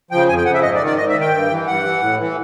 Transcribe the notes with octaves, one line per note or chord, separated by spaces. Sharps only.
C#3 F3 G5
F2 G#5
G5
C#3 F3 F#5
E5
G#2 D#5
D5
D#3
D5
G#2 D#5
E5
D#3
G5
G2
E3
G2 F#5
E3
A2
E3